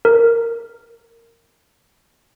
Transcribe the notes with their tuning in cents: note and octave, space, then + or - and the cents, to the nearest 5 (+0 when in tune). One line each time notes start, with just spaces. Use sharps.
A#4 -10